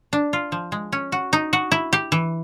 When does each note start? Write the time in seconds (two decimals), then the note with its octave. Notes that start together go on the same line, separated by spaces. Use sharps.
0.13 D4
0.33 F4
0.52 F3
0.72 G#3
0.92 C#4
1.12 F#4
1.33 D#4
1.53 F#4
1.72 E4
1.93 G4
2.12 E3